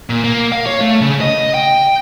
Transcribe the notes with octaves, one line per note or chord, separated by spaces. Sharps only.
A#2
A#3
F5
C#5
A3
C#3
D#5
G5